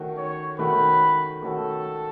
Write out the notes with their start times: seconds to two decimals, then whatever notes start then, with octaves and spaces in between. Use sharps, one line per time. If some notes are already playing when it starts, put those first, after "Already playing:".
Already playing: D#3 A3 C#4 F#4
0.17 C#5
0.59 D#3 A3 C#4 F#4 B4
1.43 D#3 A3 C#4 F#4 A4